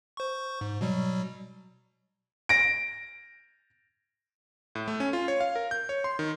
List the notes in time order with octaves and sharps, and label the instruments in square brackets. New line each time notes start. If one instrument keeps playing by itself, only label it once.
[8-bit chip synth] C5 C#6
G#2
B2 F#3 G3
[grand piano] A#6 D7
[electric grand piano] A2
A3
C#4
F4
C#5
F5
A#4
G6
C#5
C6
D#3